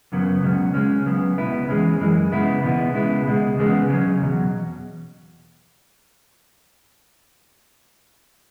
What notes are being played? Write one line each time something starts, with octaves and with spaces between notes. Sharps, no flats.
F#2 C#3 F#3 B3
C#2 B2 F#3 C#4
C#3 G#3 C#4
C#2 C#3 F#3 B3
C#2 B2 B3 E4
E2 E3 G#3 C#4
F#2 E3 G#3
C#3 G#3 B3 E4
E2 B2 B3 E4
C#3 G#3 B3 E4
C#2 B2 G#3
E2 C#3 G#3 B3
C#3 F#3 C#4
E2 B2 F#3